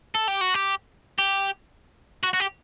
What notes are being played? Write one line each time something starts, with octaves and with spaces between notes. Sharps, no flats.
A4
G4
F#4
G4
G4
F#4
F#4
G4